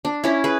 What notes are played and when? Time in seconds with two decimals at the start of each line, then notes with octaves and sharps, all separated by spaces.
0.05 D4
0.24 C#4 E4
0.44 G#4 B4